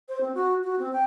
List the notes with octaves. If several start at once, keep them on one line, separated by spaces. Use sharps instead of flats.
C5
C4
F#4
F#4
C4
G5